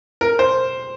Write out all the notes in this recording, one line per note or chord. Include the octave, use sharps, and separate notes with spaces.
A#4
C5